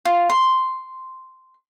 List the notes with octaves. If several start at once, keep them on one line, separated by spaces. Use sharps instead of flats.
F4
C6